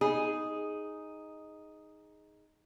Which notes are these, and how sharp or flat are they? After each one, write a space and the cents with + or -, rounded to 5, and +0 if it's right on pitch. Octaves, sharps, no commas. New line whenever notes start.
D#4 +0 G#4 +0